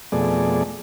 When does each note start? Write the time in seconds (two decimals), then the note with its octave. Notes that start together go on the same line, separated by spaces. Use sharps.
0.12 F2 B2 A3 G#4 D5